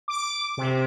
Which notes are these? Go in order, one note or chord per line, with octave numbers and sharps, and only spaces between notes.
D6
C3